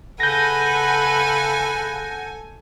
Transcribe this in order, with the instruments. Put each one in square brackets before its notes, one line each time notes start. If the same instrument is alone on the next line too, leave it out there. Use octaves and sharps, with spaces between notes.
[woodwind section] C#3 F#5 [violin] A4 G#5 [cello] B4 [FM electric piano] G6 A#6